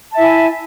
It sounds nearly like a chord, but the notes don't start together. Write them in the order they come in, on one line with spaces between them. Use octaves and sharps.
A5 E5 E4 G#5